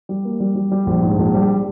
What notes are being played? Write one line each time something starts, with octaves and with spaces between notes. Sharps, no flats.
G3
A#3
G3
G3
G3
A#1
G#2
A#1
G3